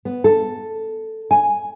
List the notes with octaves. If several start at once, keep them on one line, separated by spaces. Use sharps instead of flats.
B3
A4
G#5